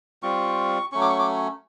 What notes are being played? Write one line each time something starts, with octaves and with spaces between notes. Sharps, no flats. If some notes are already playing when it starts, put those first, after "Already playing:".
G3 C4 F4 C#6
F#3 A3 C#4 C#6
D6
C#6
D6